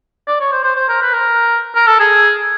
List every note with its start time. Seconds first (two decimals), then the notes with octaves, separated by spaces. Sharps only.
0.27 D5
0.40 C#5
0.52 C5
0.64 C5
0.76 C5
0.89 A#4
1.01 B4
1.13 A#4
1.75 A#4
1.87 A4
2.00 G#4